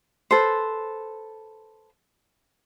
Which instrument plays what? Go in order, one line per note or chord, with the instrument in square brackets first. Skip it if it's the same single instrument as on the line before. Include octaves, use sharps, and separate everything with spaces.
[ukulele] A4 B4 C5